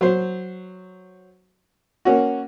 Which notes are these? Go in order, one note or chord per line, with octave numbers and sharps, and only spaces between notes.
F#3 C5
A#3 C#4 F#4